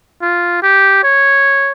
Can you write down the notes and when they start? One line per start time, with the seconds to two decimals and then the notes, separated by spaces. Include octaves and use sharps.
0.22 F4
0.63 G4
1.04 C#5